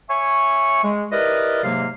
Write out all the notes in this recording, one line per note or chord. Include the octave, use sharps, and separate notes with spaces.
C#5 E5 G#5 C#6
G#3
E4 G4 A#4 B4 D5 D#5
G#2 C3 F#3 G#3 A#3 F5